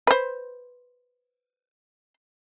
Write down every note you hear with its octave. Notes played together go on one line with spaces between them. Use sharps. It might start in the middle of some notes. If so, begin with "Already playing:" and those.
B4 C5